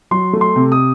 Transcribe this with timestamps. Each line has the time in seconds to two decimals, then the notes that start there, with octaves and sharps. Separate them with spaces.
0.11 F#3 C6
0.33 A3
0.41 C6
0.56 C3
0.72 D#6